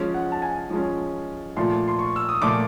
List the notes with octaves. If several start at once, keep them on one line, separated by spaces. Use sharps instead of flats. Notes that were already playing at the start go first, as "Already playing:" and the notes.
Already playing: F3 G#3 C#4
F#5
A5
G#5
F3 G#3 C#4
A#2 F3 A3 C6
C6
C#6
E6
D#6
A#2 F3 A3 D6